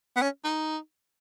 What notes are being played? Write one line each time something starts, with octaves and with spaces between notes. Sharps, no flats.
B3
C#4
D#4